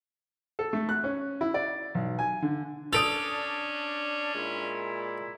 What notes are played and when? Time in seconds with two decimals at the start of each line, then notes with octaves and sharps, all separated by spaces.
0.59 A4
0.73 A3
0.89 F#6
1.04 C#4
1.41 E4
1.54 D5
1.95 B1
2.19 G#5
2.42 D3
2.93 C#4 D4 A4 D#6 D7 F7
4.33 A#2 G#3 E4